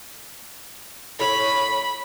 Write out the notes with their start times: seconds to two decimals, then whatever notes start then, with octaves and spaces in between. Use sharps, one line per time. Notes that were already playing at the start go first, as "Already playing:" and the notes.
1.20 A2 C#5 B5